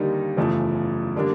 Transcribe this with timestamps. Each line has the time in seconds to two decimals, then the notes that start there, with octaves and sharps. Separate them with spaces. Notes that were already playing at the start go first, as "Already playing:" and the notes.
Already playing: D#2 D3 G3 A#3 D#4
0.37 F#1 E2 C#3 F3 A3
1.16 D3 G3 A#3 D4